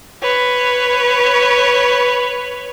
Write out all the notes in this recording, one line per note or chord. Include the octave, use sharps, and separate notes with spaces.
B4 C#5